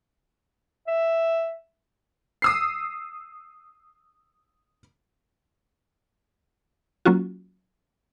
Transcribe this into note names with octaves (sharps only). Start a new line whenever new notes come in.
E5
D#6 E6 C7
F#3 A#3 C#4 F4 F#4